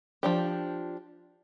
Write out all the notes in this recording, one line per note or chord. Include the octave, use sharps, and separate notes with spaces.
F3 D4 G4